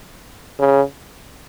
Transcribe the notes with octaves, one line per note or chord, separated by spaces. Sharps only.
C#3